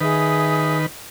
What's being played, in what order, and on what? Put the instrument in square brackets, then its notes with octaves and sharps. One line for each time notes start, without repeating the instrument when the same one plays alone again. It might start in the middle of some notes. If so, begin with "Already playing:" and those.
[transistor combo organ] D#3 B4 [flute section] G#4 E5 D#6